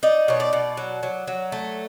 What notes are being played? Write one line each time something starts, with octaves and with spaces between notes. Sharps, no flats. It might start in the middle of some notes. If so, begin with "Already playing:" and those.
D#4 D5
B2 C#5
D5
B2
F#3
F#3
F#3
A3